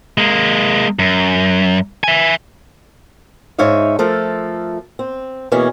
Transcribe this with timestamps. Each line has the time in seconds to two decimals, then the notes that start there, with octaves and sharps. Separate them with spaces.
0.18 G#3 A#3
0.99 F#2
2.04 E5 G#5
3.58 G#2 D#4 C#5 E5 F5
3.99 F3 A3 A4 A#4
4.99 C4
5.52 B2 E3 A#3 C#4 G#4